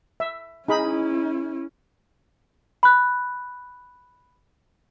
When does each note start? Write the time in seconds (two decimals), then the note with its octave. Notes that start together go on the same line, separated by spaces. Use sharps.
0.20 E5
0.68 C#4 D#4 E4 G#4 B5
2.83 B5 F#6